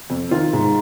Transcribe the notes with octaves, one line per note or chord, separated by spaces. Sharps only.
F2
D#3 F4
G#2